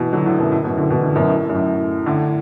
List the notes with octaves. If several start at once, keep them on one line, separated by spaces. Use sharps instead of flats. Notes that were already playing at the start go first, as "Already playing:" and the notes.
Already playing: B2 E3
D3 F#3
A2 D3
F#2 B2
A2
F#2 B2
A2 D3
B2 E3
A2 D3
F#2 B2
A2
A2
F#2
A2
A2 D3